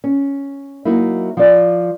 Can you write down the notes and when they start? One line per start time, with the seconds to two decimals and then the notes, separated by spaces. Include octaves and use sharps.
0.04 C#4
0.85 F#3 A#3 D#4 E4
1.37 F3 D5